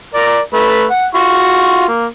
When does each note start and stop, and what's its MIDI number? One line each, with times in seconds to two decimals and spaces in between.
0.14 0.39 70
0.14 0.39 74
0.54 0.85 57
0.54 0.85 71
0.91 1.06 78
1.15 1.84 65
1.15 1.84 66
1.15 1.84 85
1.89 2.07 58